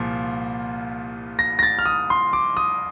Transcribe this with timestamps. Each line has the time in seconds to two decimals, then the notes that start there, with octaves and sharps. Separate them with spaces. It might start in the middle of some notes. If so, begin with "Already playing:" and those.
Already playing: C2 A#2 F3
1.39 A#6
1.59 A#6
1.63 A6
1.79 F6
1.86 D#6
2.10 C6
2.33 D6
2.57 D#6